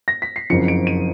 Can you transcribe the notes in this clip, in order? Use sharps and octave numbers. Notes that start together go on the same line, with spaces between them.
A#6
B6
C7
F#1 F2 C#3 F3 C#7
D7
D#7